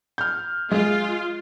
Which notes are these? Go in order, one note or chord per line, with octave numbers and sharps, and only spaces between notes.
F6 G6
G#3 F4